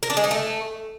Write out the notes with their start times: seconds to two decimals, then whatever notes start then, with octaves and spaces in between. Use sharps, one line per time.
0.03 A#4
0.10 D4
0.17 G#3
0.24 D#4
0.31 A3